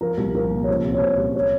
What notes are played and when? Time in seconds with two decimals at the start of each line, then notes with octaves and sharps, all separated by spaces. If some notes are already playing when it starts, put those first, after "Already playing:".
0.01 F3 A#4
0.17 C2
0.35 F3 A#4
0.51 A#2
0.64 C#5
0.67 C#2 C5
0.85 C3
0.94 C#5
1.01 C#2 C5
1.18 G3
1.35 C#5